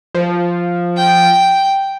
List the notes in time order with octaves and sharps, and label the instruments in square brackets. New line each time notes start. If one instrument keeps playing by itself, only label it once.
[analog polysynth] F3
[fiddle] G5